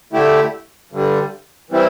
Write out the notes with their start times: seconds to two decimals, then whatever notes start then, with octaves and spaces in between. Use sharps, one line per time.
0.13 D3 A3 E4 G4
0.92 G2 D3 G3
1.70 E3 G3 C4 E4